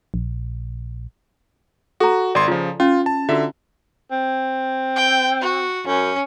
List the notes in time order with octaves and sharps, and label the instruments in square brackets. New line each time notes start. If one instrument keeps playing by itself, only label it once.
[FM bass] A#1
[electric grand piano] F#4 [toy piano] A4 A#5
[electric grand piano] G#1 C6 [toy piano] D5
[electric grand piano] C#3 F3 [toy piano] F4
[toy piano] C#4 [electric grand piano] F4
[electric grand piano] A5
[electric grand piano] D3 E5 [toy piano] F4 F#4
[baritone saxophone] C4
[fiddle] G5
F#4
[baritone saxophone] F#2 [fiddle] C#4